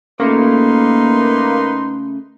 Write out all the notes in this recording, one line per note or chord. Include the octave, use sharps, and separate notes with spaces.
C#3 A3 A#3 D#4 B4 C6